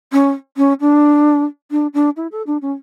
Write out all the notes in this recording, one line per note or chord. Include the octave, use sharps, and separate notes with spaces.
C#4
C#4
D4
D4
D4
E4
A4
D4
C#4